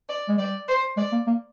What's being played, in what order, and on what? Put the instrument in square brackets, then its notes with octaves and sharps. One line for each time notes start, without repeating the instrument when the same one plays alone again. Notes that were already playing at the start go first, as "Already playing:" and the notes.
[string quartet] D5
[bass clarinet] G#3
[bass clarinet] G3 [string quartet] D5
[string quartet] C5
[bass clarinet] G#3 [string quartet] D5
[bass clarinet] A#3
A#3